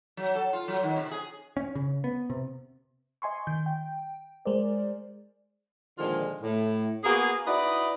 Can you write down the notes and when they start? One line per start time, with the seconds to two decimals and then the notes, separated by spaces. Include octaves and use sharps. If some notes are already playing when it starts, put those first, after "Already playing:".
0.17 F#3
0.35 A4
0.53 F4
0.68 F#3
0.83 D#3
0.96 C3
1.11 G#4
1.57 C#4
1.75 C#3
2.04 B3
2.30 C3
3.22 D#5 G#5 C6 C#6
3.47 D#3 G6
3.66 G5
4.45 G#3 G#4 A#4 C5 D5
5.98 A#2 D3 D#3 F3 G#3 F4
6.41 A2
7.04 A#3 B3 F#4 G#4
7.46 D#4 E4 F#4 B4 D5 D#5